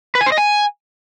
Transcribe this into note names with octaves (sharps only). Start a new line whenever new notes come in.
B4
G#5
C5
D#5
G#5